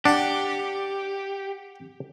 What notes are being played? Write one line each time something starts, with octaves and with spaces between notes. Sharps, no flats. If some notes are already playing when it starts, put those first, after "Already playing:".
D4 G4 F#5 G5